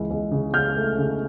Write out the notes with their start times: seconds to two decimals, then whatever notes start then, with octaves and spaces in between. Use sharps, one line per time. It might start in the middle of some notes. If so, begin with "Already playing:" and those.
Already playing: C#2 E3
0.10 C#2
0.31 C#3
0.53 C#2 F6 G6
0.77 A3
0.98 C#3